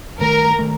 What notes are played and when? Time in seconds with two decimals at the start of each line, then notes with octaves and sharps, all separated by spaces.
0.19 G2 D#3 A3 A#4
0.59 D#3 A3